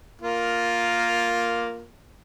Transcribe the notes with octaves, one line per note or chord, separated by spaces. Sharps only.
A#3 F4 A#4